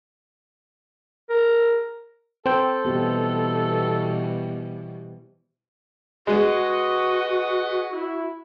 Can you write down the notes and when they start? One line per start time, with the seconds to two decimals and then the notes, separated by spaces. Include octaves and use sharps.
1.29 A#4
2.46 C4 A4 C5 G5
2.85 B2 E3 G3 B3 G4
6.27 G#3 F#4 G#4 B4 D#5
7.92 E4